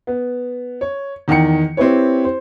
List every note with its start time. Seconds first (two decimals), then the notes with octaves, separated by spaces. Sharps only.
0.07 B3
0.81 C#5
1.28 E2 D#3 F#5 G5 C#7
1.77 C4 E4 G4 B4 C#5
2.25 C5